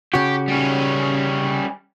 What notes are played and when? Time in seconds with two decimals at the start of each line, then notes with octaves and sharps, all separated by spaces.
0.14 C#3 F#4 G4
0.48 G3 C#4